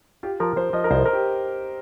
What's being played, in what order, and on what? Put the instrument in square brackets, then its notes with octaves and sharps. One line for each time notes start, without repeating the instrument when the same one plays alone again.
[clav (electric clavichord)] F4 [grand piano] G4
[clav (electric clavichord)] F3 [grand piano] A#4
[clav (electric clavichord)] F3 [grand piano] C5
[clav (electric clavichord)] F3 [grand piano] D#5
[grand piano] A#4
[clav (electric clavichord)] C2 [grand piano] C5
[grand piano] A#4
G4